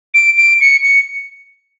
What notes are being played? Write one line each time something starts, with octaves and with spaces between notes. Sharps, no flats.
D7
D7
C#7
C#7